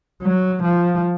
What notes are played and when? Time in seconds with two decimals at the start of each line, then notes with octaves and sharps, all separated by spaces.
0.22 F#3
0.63 F3